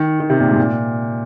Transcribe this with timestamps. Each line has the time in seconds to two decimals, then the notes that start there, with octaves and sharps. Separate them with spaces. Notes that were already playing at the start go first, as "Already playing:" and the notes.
Already playing: D#3
0.20 D#3
0.30 C3
0.39 A#2
0.49 G#2
0.58 A#2